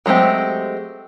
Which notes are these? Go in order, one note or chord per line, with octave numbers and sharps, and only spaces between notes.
F#3 G#3 A3 C4 G4